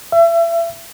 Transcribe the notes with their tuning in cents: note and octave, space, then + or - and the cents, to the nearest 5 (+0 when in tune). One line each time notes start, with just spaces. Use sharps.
E5 +35